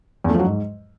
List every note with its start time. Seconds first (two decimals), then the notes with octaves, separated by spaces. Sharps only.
0.24 E2
0.29 A3
0.34 F3
0.40 F#3
0.45 G#2